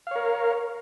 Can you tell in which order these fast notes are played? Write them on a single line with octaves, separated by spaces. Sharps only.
F5 C#5 A#4